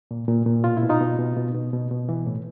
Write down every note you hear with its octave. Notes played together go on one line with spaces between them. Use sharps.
A#2
A#2
A#2
B2 F4
E4
B2
D#4 F4
B2
B2
B2
B2
B2
B2
E3
A2